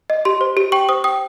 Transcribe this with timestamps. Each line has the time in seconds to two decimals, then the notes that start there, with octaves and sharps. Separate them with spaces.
0.10 D#5
0.25 G4 C6
0.41 C5
0.57 G4
0.72 G5 C#6
0.89 C5 D#6
1.04 G5 D#6